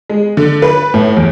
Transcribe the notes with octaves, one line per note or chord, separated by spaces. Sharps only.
G#3
D3
B4
A2
E2